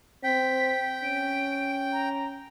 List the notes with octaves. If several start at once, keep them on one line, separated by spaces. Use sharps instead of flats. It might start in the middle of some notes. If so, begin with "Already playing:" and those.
C4 G5 B6
C#4 D7
A#5